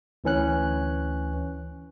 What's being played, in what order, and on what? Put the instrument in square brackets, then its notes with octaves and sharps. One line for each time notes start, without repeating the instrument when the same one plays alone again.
[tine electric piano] D2 E3 C#4 F#6